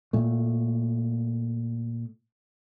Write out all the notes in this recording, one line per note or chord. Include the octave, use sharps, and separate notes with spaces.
A#2 A3